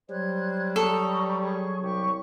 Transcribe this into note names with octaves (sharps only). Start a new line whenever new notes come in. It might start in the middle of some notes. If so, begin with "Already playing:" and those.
F#3 G3 C5 F#6 G#6
A4 A#5 C#6 D#6
G#4 C#6
C2 G4 C#6